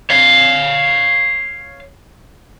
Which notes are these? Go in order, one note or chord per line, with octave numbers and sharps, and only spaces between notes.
C#5 F5